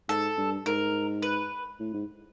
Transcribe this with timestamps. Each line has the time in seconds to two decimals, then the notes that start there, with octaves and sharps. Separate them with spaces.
0.09 G#2 A4
0.37 G2
0.66 G#2 A#4
1.22 B4
1.80 A2
1.94 G#2